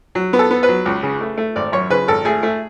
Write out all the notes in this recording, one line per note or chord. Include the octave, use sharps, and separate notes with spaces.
F#3
B3
A4
B3
B4
F#3
C#2
C#3
A3
A3
G#1 D5
F#2 C#5
C#3 B4
G#1 A4
A3 G#4
A3